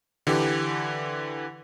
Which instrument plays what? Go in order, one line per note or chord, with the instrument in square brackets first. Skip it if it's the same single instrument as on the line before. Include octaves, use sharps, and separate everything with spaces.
[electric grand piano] D3 E3 G4